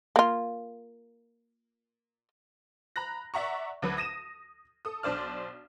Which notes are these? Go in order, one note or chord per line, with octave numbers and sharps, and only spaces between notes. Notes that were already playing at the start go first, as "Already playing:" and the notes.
A#3 F4
A#5 B5 F#6 A#6
D5 E5 F#5 A#5 C#6
D2 F#3 B4
D#6 A#6 D#7 E7
A4 D#6
B1 D4 C5 D5 F6